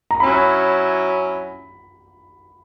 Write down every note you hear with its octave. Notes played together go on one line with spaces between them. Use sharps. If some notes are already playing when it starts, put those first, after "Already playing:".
A#5
F#3 C#4 E4 B5